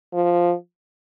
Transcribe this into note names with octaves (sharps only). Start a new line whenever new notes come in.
F3